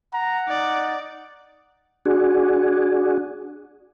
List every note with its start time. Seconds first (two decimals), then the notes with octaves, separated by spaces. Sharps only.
0.14 F#5 A#5
0.49 D#4 D5
2.05 D4 F#4 G#4